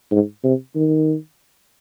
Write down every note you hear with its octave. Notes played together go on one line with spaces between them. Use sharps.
G#2
C3
D#3